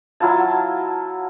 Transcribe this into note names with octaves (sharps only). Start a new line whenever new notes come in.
F#3 E4 F4 A5